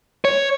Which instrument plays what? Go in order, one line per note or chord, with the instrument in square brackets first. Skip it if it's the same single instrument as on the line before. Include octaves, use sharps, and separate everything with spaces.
[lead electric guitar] C#5